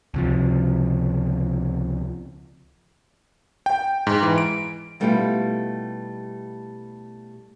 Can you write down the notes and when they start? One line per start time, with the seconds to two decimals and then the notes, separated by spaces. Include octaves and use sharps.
0.14 C#2 C3 F3
3.66 G5
4.07 G#2
4.23 E3
4.38 D7
5.00 B2 G3 A3 E4 F4 G4